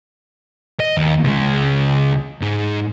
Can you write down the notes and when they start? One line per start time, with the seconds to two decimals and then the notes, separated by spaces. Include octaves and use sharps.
0.80 D#5
0.97 D#2
1.24 C#2 G#3
2.41 G#2